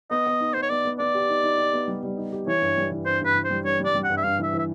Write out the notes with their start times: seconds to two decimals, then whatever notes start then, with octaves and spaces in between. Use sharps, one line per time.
0.11 B3 D#5
0.26 B3
0.41 D#4
0.54 B3 C5
0.62 C#5
0.70 B3 D5
0.85 B3
0.99 B3 D5
1.15 G4
1.29 D#4
1.44 D#4
1.58 G4
1.73 B3
1.88 G3
2.03 G3
2.17 D#4
2.32 G4
2.47 E3 C#5
2.62 G2
2.77 G3
2.91 E3
3.06 G2 C5
3.21 G2 B4
3.35 E3
3.45 C5
3.50 G3
3.65 G2 C#5
3.80 G3 D5
3.95 G3
4.04 F#5
4.09 G2
4.17 E5
4.24 G2 F5
4.39 E3 E5
4.53 E3
4.59 E5